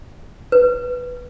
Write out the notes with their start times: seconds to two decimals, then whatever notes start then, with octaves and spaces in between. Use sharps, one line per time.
0.52 B4